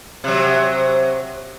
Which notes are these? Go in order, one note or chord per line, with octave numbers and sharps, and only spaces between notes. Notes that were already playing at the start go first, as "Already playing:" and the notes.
C3 F#3